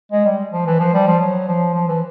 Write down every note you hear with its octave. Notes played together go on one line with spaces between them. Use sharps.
G#3
G3
F3
E3
F3
G3
F3
F#3
F3
F3
E3